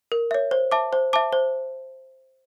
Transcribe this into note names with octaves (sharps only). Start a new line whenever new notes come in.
A#4
C#5 E5
C5
E5 A5 D6
C5
E5 A5 D6
C5